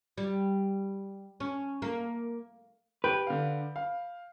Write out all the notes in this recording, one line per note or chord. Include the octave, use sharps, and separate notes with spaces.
G3
C#4
A#3
G4 B4 G6 D7
D3 F5
F5